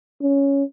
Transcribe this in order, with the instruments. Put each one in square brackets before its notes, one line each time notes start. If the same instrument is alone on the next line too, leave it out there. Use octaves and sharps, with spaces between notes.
[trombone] C#4